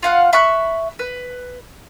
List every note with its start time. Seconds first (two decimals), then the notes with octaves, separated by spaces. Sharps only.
0.03 F4 F5 F#5
0.33 E5 B5 C#6 F#6
0.99 B4